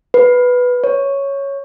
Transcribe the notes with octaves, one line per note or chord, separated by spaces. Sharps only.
B4
C#5